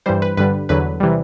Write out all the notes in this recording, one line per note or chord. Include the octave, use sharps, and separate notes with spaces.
G2 E3 G3 C5
B4
G2 D3 G3 B4
E2 D3 F#3 B4
C3 E3 G3